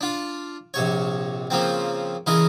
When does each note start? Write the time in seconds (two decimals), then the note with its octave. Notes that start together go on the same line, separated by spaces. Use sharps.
0.01 D4 F4
0.74 A#1 C3 C#5
1.50 C#3 F3 A#3 C4
2.27 C#3 E3 G#3 A#4 D#5